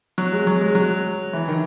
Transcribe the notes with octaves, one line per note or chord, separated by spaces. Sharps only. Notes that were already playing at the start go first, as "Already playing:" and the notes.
F#3
G#3
F#3
G#3
F#3
E3
D#3